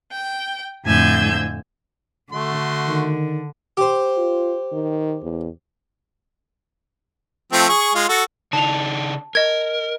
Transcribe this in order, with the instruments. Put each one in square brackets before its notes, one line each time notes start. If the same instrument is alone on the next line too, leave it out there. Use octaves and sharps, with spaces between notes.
[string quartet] G5
F2 A2 D3 G#5 E6 G6
[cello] D3 [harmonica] A3 F#4 C6
[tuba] D#3
[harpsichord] G4 C5
[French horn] F4
D#3
E2
[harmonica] F3 A3 C4
G#4 C#6
G#3 F4
F#4 A4
[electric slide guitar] C#3 D4 D#4 [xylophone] A5 F7
[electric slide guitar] A#4 [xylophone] D#5 G#6